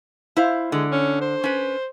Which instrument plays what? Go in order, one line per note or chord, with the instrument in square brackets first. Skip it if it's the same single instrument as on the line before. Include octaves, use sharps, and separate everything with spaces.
[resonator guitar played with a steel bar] E4 C5 F5
[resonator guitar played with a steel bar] D3 [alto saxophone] G#3
[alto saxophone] C#4
C5
[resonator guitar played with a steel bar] C#4 B4